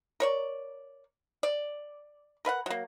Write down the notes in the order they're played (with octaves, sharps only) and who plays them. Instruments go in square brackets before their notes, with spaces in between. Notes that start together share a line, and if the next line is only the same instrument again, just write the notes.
[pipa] A#4 C#5 D5
D5
A#4 B4 F5 F#5
F#3 A#3